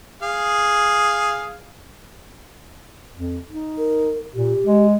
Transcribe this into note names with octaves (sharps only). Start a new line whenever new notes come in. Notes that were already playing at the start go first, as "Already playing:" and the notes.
G#4 F5
F2
D#4
A#4
A#2 G4
G#3